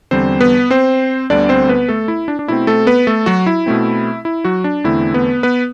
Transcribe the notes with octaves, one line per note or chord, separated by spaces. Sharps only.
E2 D3 G3 C4 C5
B3 B4
C4 C5
D2 D3 G3 B3 D4 D5
C4 C5
B3 B4
A3 A4
E4
D4
D4
B2 A3 C4 E4
A3 A4
B3 B4
A3 A4
F#3 F#4
E4
B2 A3 C4
E4
F#3 F#4
D4
E2 D3 A3 C4 E4
B3 B4
B3 B4